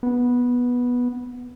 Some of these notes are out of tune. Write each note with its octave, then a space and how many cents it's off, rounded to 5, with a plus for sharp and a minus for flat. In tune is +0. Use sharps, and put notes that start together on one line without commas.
B3 -10